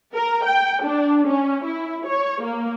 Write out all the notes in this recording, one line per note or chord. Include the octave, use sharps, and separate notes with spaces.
A#4
G5
D4
C#4
E4
C#5
A#3